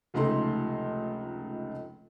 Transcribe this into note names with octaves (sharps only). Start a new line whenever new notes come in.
F1 C#2 A3 D#4 A4 C6